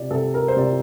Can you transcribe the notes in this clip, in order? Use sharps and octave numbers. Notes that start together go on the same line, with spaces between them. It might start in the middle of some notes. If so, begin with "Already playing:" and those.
Already playing: C3 D5
C3 A4
A#4
C5
C3 D5